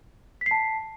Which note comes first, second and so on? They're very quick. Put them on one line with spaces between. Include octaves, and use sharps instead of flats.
B6 C7 A5